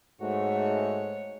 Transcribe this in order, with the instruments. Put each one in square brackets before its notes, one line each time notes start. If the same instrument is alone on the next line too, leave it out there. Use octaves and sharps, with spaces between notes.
[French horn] G#2 [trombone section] A3 F#4 [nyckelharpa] C#5